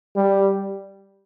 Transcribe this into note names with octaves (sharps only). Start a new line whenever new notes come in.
G3